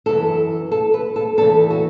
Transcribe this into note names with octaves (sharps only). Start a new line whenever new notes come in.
F#2 E3 A4
A4
B4
A4
E2 E3 A4
F#4